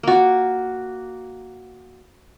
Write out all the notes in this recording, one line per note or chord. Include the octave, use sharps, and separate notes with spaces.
A#3 F#4